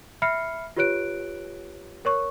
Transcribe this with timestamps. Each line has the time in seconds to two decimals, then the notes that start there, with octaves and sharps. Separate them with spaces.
0.22 E5 B5 F6 C7 C#7
0.76 F4 G4 B4 C#5 F#6 D7
2.05 A#4 C#5 C#6